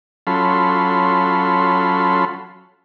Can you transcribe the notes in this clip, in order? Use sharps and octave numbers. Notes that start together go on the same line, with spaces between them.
F#3 C#4 F4 A4 B5 C6